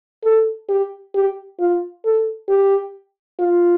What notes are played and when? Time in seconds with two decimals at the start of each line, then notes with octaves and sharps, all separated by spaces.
0.24 A4
0.69 G4
1.15 G4
1.60 F4
2.05 A4
2.49 G4
3.40 F4